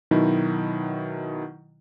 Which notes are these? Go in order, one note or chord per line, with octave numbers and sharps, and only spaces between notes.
B2 D#3 F#3 D#4 E4